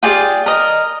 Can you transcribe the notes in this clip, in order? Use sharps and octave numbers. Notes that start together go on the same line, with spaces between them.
F4 G4 G#4 D5
A#4 D#5